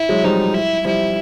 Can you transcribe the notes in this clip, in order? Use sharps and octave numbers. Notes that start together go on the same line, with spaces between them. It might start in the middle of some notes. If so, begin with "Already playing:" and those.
Already playing: E4
F#3 G#3
F3 G3 D#4
E4
F3 G3 E4